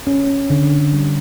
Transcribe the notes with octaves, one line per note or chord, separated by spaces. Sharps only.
C#4
D3
G3